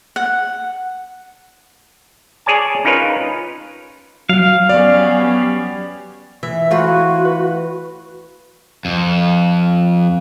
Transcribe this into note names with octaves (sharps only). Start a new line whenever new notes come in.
F#5
G#4 C#5 D5 G#5 A5
C#4 D#4 F4 A#4 B4 C#5
F#3 F5
B3 C#4 G4 D5
E3 E5
E3 A3 F4 F#4 C5 C#5 B5 C#6
B4
F2